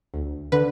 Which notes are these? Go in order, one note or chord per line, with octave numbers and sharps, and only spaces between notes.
D2
D3 B4